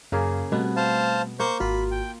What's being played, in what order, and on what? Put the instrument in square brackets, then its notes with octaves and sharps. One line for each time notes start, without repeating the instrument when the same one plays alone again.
[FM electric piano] F#2 [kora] C#3 A#3 G#4
[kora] B2 B3 [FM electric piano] G3 A3 C4
[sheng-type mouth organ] C5 F5 A5
[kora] A#3 [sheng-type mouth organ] C5 C#6 G6
[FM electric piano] G#1 F#4 [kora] F4 [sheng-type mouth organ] B5
[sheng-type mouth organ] G5